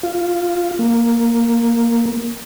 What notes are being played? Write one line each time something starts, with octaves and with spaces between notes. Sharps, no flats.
F4
A#3